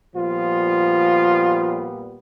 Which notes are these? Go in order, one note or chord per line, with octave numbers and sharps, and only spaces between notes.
A#2 F3 G3 B3 F4